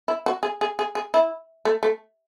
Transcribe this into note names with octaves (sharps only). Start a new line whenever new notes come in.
E4
F#4
G#4
G#4
G#4
G#4
E4
A3
A3